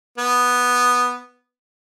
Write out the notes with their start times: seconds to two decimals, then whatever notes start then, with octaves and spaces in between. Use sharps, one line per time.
0.18 B3